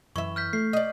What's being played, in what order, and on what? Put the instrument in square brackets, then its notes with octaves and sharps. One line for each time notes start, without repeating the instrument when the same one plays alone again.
[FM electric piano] F#2 [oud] E3 E5 [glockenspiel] C#6
[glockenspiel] F6 G6 B6
[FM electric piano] A3 [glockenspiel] C7
[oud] D5 D#5